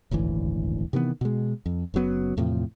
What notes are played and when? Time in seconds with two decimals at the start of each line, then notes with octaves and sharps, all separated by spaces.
0.11 D#1 G#1 D2 E3
0.93 C3 D#3 E3 B3
1.21 B2 G#3
1.66 F2
1.94 F#1 C#3 F#3 B3
2.37 E2 A2 C3 F3